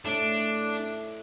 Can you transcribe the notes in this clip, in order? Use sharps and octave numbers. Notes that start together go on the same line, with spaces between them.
A2 D4